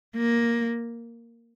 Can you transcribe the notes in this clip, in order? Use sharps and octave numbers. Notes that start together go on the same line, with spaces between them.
A#3